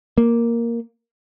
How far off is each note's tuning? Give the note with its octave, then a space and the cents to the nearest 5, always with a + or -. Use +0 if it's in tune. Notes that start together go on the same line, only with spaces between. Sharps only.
A#3 +0